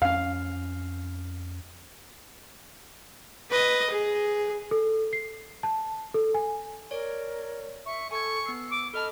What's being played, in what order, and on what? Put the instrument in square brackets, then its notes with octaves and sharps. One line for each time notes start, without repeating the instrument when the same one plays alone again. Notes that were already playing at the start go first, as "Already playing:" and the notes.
[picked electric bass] F2 C#4 [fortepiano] F5
[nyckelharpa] B4 D#5
G#4
[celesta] A4
C7
A5
A4
G#5
[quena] A#4 [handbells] C#5 D5 D7
[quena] E5 [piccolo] C#6
[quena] A4 [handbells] G#5 A5 G#6 [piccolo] C#6
[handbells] B3 C7 [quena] E6
[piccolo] D6
[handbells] A4 D#5 A5 [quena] B5 [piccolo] F6